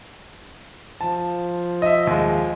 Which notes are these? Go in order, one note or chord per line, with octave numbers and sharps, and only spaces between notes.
F3 A5
D#5 E5
D#2 G#3